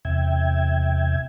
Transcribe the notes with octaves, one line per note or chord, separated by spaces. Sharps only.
E2 C3 E5 G5 G#6